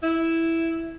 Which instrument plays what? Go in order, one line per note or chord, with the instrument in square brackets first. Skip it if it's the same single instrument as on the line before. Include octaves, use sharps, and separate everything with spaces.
[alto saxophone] E4